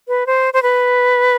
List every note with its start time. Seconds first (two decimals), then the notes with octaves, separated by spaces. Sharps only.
0.08 B4
0.27 C5
0.54 C5
0.63 B4